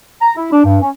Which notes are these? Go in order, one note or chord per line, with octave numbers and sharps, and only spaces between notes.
A#5
E4
D4
G2
C#4